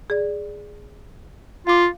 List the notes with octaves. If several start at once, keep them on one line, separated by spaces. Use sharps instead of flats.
G#4 D5
F4 F5 D6